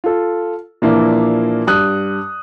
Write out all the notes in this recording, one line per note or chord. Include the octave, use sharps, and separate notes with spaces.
F4 A4
A#2 E3 F3 A#3 D4 E4
G2 D#6 F#6